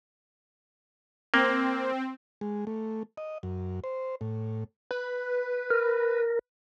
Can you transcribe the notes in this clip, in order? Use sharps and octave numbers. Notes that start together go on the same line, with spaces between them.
A#3 C4
G#3
A3
D#5
F#2
C5
A2
B4
A#4